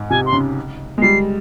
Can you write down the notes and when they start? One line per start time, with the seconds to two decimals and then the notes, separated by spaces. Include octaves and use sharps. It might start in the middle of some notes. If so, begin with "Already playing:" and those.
Already playing: G#2
0.10 C3 G#5
0.26 C6
0.33 C#3
0.98 G#3
1.02 G3 C7